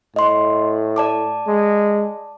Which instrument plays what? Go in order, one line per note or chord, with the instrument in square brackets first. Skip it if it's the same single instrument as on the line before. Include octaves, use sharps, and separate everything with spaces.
[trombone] A2 [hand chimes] D#5 C6
[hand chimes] D5 A5 D6
[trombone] G#3